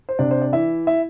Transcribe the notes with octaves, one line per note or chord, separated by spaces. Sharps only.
C5
C3 D4 D5
C5
D5
E3 E4 E5
E4 E5